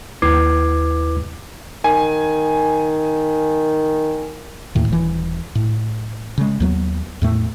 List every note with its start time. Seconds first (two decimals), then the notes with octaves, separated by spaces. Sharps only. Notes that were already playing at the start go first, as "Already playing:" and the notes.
0.22 D#2 E4 B4 D6 G#6 C7
1.84 D#3 G#5
4.75 D#2 A2 D#3
4.88 D#1 E3
5.55 A2
6.38 C#3 G#3
6.60 D#2 F#3 B3
7.22 E2 A2 A3